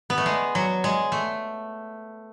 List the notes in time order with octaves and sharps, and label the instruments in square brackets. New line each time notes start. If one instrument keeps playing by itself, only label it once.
[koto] B3
A3
G#3
F#3
G#3
A3